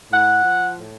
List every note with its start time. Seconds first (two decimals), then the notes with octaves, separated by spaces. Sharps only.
0.12 A2 F#5
0.45 F3
0.77 A2